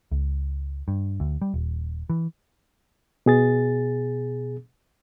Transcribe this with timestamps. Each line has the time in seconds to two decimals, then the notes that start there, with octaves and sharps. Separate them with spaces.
0.11 C#2
0.88 G2
1.20 D2
1.42 G3
1.54 D#1
2.10 E3
3.26 B2 G#4 A6